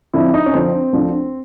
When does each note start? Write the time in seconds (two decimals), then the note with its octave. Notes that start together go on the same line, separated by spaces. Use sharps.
0.13 F2 D3 F3 E4
0.34 D#4
0.46 C#4
0.53 F2 D3 F3 C4
0.93 D2 D3 F3